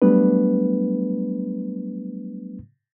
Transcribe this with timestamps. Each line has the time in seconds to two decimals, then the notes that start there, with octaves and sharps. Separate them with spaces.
0.02 F#3 G3 A3 B3 D4 B4